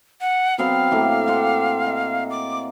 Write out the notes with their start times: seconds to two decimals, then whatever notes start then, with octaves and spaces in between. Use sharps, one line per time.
0.21 F#5
0.58 F#3 B3 C4 F5
0.91 A2 A#3 G4
1.27 C5 D5 F#5
1.86 D#5
2.30 D6